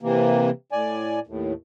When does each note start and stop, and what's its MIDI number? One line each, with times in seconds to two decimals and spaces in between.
0.02 0.50 48
0.02 0.50 52
0.02 0.50 58
0.72 1.19 45
0.72 1.19 74
0.72 1.19 80
1.27 1.53 39
1.27 1.53 45